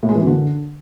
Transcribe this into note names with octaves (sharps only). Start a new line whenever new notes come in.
A2
G#3
E3
F#2
D3